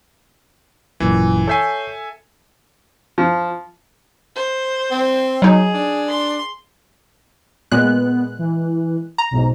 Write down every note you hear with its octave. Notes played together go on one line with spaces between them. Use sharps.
G#1 F#2 A#2 E3
A4 C#5 E5 G#5 G6 C7
F3
C5
C4
F#3 D#4 G#4
D4
C6
A#2 G#3 B3 F#6
E3
A#5
B1 G#2